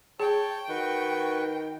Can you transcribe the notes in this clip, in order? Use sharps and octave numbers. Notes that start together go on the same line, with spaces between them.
G#4 C#5 G5 A5
D#3 F#4 B4 C#6